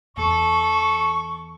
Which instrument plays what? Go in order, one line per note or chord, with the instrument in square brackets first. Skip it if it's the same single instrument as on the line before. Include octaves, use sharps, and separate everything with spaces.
[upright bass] E2 E3 [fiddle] A4 [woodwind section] C#6